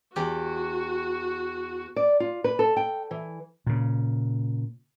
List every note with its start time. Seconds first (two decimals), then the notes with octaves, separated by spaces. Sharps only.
0.16 E2 F#4 G4
1.96 D5
2.20 F4
2.44 B4
2.59 A4
2.77 G5
3.11 E3
3.67 A#2 C#3